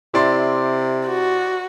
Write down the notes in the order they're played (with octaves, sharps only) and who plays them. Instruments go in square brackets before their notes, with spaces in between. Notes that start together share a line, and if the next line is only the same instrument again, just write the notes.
[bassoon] C3 [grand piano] E4 D5 C6
[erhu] F#4